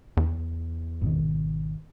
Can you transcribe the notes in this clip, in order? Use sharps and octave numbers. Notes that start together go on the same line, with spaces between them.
E2
G#1 B2 D#3